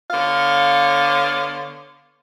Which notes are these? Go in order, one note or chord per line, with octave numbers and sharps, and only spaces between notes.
D3 B3 C#5 F5